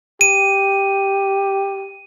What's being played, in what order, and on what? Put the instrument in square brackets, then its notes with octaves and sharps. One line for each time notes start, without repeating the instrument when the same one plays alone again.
[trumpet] G4 [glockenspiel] D#7